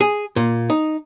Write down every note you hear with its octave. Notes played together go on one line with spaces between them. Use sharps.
G#4
A#2
D#4